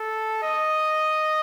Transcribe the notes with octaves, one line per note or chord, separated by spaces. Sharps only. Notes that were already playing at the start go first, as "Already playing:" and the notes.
Already playing: A4
D#5